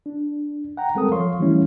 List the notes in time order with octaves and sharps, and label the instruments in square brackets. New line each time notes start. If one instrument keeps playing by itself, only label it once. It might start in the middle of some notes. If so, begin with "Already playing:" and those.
[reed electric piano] D4
F#5 G5 A#5
G3 G#3 C4 A4 A#4 D#6
F3 C#5 F5 C6 C#6
E3 G3 A3 C#4 E4